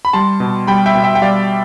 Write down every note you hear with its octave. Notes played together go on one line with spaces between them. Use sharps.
B5
G3 A5 C6
B2
G3 G5 B5
E5 G5
B2
E5 G5
G5
G3 D5 F5